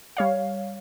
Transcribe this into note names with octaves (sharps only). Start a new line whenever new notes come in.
G3 C#5 F5